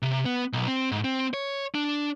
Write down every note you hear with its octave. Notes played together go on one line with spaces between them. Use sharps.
C3
B3
B1
C4
G#2
C4
C#5
D4